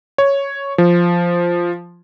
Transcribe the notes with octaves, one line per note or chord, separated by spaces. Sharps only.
C#5
F3